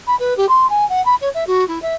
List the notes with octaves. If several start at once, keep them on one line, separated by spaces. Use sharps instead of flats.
B5
B4
G4
C6
G#5
F#5
B5
C#5
E5
F#4
E4
E5